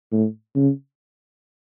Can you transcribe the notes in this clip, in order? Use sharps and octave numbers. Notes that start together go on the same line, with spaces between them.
A2
C#3